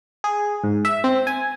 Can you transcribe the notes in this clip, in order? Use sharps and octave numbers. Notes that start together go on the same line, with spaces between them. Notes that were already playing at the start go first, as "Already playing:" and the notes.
G#4
G#2
E5
C4
G#5